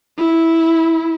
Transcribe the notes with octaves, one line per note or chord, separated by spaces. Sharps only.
E4